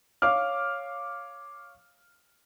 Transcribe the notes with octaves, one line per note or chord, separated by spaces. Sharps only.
C#5 F5 D6 F6